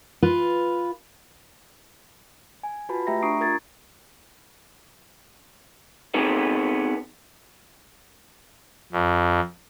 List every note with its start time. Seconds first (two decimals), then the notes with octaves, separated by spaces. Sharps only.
0.23 F4 B4
2.63 G#5
2.89 F4 F#4 B4 A5 B5
3.07 A3 G4 E5 G5 A#5 A#6
3.23 D4 A#5 C#6 D#6 C7 D7
3.40 F4 A#4 G#6 A6
6.14 B3 C4 D#4 G#4 B4
8.93 F2